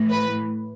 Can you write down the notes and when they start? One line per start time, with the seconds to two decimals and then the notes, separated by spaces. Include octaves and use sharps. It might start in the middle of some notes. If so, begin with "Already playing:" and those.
Already playing: A2 E3
0.10 B4